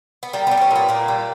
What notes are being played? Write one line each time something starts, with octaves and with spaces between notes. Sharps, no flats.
B3
G3 A#3
B3
G3
B3
C#4
A#2 B3
A#2 A#3
G3